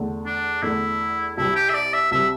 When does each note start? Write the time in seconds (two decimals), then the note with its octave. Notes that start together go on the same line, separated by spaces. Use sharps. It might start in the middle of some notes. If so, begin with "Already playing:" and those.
Already playing: E2 D3 A3
0.26 D4
0.62 E2 D3 A3 E4
1.37 C2 C3 G3 E4
1.56 G4
1.70 E5
1.74 D5
1.93 E5
2.11 C2 C3 G3 E5